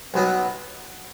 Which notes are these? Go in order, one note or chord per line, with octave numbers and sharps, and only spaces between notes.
B1 B2 F#3 B3